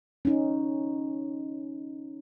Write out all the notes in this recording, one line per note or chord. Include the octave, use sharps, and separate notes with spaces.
C#4 D#4